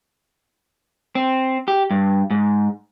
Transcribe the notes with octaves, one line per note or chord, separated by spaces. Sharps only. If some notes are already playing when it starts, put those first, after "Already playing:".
C4
G4
G2
G#2